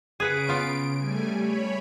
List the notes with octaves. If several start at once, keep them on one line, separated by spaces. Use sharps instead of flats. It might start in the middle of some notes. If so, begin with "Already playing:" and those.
C#3 G#4 B4 F#5 D7
B3 F4
G3 A3 G#5
C#5 B5